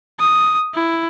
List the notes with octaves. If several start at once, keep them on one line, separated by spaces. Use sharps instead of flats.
D#6
E4